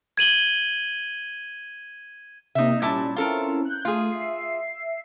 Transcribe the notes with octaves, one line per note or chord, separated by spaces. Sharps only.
G#6 D#7 F#7 G7
C3 A#3 D#4 E5
A#2 G3 C#4 E4 A5
C4 C#4 E4 F4 A4 A#4
F#6 G6
A3 F4 G#4
E5 C7